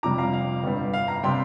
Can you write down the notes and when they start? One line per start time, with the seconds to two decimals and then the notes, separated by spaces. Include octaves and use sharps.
0.03 F2 C3 G3 A#5 D6
0.18 F5 A#5
0.33 F5
0.64 G1 G2 G3
0.94 F5
1.08 F5 A#5
1.23 C3 G3 G5 C6